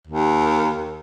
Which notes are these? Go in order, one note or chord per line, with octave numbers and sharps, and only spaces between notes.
D#2